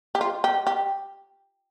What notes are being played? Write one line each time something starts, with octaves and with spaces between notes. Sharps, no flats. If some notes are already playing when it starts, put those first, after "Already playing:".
G4
F4
G4
G4